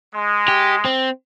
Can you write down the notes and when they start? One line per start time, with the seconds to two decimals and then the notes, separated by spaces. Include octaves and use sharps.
0.13 G#3
0.48 G4
0.85 C4